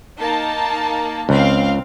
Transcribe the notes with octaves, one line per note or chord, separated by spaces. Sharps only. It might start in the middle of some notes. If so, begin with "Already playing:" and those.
A#3 D#4 A5
C#2 C4 F5